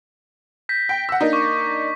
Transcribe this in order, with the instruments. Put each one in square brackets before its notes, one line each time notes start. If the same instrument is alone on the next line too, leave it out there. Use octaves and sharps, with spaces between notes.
[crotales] G6 A#6 B6
[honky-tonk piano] G5
F#5 E6
A#3 D4 D#4
[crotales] C#6 D6